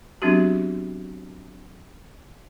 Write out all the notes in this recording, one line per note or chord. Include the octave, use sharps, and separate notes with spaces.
F#3 B3 C4 D4 F#4 G4